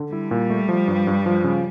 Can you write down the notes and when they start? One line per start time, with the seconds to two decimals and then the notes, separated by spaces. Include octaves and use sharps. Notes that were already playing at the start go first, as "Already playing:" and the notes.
Already playing: D3
0.12 G3 E4
0.31 A#2
0.50 A3
0.69 F3
0.88 G2
1.07 G2
1.26 F3
1.44 C#3